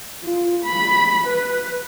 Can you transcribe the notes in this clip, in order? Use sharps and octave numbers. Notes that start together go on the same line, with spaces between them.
F4
B5
B4